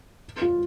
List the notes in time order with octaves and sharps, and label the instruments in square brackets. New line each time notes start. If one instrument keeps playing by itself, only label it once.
[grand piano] F4